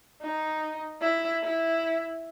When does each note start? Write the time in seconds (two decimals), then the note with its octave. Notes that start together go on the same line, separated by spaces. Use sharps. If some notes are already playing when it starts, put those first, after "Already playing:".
0.22 D#4
1.01 E4
1.42 E4